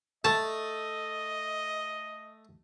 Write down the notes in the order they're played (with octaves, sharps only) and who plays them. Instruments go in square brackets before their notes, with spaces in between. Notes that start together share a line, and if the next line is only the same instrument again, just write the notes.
[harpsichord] A3 [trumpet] D#5 [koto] A5